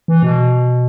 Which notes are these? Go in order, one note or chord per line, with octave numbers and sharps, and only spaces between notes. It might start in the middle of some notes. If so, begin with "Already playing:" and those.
E3
B2